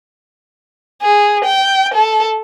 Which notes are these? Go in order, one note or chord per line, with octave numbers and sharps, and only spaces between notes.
G#4
G5
A4